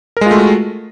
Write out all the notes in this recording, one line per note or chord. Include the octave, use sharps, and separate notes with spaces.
G#3 A3 F4 F#4 A#4